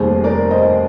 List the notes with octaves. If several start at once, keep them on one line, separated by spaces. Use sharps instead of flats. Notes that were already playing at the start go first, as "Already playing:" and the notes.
Already playing: F1 D#2 D#3 G3 G#4 C5
A#4 D5
C5 D#5